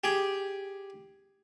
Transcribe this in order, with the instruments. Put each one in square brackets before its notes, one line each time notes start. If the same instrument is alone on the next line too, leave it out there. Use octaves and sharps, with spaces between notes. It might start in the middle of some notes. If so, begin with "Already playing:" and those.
[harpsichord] G4 G#4